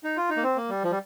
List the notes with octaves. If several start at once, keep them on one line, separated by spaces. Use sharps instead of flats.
D#4
F4
D#4
A#3
C4
A#3
G3
F3
G3